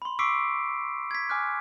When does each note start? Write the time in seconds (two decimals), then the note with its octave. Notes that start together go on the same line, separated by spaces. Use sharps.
0.02 B5 C6
0.19 C#6 D6 E6 B6 C7 D7
1.11 G#6 B6
1.29 G#5 D6 F6 F#6